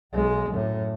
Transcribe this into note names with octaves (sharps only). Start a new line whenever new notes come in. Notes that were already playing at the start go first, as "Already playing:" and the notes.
B1 G#3
F#2 A2